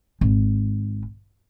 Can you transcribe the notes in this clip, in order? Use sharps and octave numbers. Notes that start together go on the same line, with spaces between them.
G#1